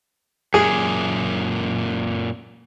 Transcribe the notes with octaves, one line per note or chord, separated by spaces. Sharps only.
F#2 A#2 G#4